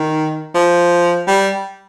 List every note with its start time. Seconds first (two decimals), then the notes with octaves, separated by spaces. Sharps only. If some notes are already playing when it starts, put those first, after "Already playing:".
Already playing: D#3
0.55 F3
1.28 G3